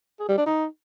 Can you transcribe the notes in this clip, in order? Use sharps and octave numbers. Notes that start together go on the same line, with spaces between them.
G#4
G3
D4
D#4